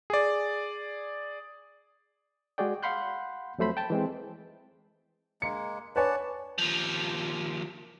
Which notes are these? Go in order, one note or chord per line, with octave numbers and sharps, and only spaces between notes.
G#4 D5
G#3 F#4 G#4 D5 G5
F5 F#5 B5 C6 F#6 G6
F2 F#3 A3 C5 B5
G5 A5
E3 G#3 C4
G#3 A#3 C#7
B4 C#5 D5 F#5 G#5 A5
D#2 F3